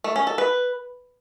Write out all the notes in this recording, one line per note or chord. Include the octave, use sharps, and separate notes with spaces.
A3
C#4
A4
B4